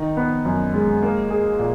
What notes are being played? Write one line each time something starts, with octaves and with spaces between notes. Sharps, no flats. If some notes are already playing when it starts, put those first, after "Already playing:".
Already playing: D#3 D#4
B3
F#2
G#3
A#3
G#4
A#2